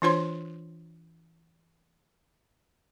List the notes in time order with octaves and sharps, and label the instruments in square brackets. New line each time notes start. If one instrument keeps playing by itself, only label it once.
[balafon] E3 D4 F4 C5 C#5 C6